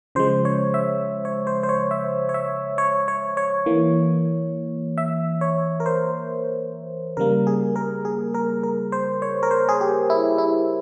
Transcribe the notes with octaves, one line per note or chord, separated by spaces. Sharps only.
C#3 F3 G#3 C5
C#5
E5
C#5
C5
C5
C#5
E5
C#5
E5
C#5
C#5
C#5
E3 A#3
E5
C#5
A#4
C5
C#3 G3 A#3 A#4
G#4
A#4
G#4
A#4
A#4
C5
C#5
A#4
C5
G#4
G4
E4
E4